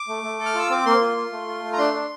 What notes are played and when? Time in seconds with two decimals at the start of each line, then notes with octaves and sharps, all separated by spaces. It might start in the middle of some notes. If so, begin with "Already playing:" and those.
Already playing: D6
0.08 A3
0.23 A3
0.39 A4
0.46 F6
0.55 F4 E6
0.70 C4 D6
0.86 A#3 C6
1.01 F4
1.17 F4
1.33 A3
1.47 F4
1.63 A3
1.73 A#5
1.78 D4 C6
1.94 D4